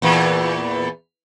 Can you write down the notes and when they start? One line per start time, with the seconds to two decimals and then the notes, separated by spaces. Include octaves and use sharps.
0.02 E2 A#2 E3